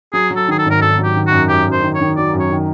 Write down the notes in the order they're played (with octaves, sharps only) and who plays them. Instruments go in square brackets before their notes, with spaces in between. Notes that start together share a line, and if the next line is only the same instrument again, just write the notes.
[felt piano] F#3 [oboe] G#4
[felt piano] F#3
[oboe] A4
[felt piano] D#3 [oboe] G#4
[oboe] A4
[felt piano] G#1
[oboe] A#4
[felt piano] G#1 [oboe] A4
[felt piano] F#3
[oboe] G4
[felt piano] D#3
[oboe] F#4
[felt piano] F#2
[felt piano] F#2 [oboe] G4
[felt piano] F#2
[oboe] C5
[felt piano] D#3
[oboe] C#5
[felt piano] D#3
[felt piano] F#3 [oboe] D5
[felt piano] F#2
[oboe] C#5
[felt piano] D#3